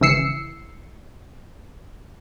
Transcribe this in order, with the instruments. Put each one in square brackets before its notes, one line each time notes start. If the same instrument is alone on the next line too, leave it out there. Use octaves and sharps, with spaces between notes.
[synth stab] G#1 C#3 E3 E6 C7 C#7